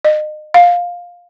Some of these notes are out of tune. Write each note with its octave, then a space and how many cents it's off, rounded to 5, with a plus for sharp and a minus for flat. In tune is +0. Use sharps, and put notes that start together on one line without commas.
D#5 -30
F5 +15